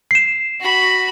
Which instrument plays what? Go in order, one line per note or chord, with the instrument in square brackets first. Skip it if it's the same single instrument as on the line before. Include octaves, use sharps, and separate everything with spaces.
[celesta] C7 E7
[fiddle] F#4 B5